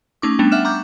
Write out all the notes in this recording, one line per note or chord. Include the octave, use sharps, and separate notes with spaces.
A3 C#4 D#4 C#6 D6
G3 A3 B3 D4
E5 F#5 D6 F6 F#6 E7
A#5 C#6 D6 F6 G6